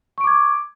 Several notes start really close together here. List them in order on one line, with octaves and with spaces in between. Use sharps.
C#6 D7 D6 G#6